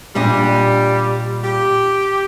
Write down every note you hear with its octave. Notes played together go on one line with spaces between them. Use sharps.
A#2 G3 D4 D#5
G4